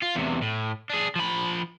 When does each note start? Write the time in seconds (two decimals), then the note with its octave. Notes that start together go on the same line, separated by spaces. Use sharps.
0.03 F4
0.16 E2 C3
0.42 A2
0.90 D4 G#4
1.15 F3 B5